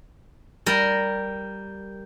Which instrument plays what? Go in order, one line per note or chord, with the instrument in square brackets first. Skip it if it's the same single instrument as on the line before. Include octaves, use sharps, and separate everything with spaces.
[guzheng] G3 A#4